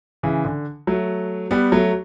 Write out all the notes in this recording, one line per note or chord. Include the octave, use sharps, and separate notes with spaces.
C#3 E3
D3
F#3 A3
G3 B3
F#3 A3